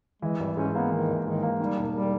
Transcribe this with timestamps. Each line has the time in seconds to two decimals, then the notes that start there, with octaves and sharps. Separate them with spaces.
0.22 E3 G#3
0.40 G#1 G3
0.57 G#2 C#4
0.74 A#3 B3
0.91 D#3 E3
1.08 G#1
1.25 G#2 D#3
1.43 A#3
1.60 D#3 G3
1.76 E1
1.94 G3